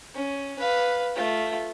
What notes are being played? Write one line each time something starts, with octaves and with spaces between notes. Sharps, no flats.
C#4
B4 F5
A3 F4